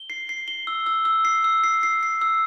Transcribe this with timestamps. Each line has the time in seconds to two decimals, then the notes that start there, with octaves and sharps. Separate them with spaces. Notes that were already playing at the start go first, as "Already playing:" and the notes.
Already playing: G7
0.10 C7
0.29 C7
0.48 G7
0.67 E6
0.86 E6
1.05 E6
1.25 C7
1.44 E6
1.64 C7
1.83 C7
2.03 C7
2.21 E6